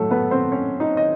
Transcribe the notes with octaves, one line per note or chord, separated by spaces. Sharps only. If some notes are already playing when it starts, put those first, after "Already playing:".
Already playing: A2 F#3 A3 A4
B3 B4
C4 C5
C#4 C#5
D#4 D#5
D#5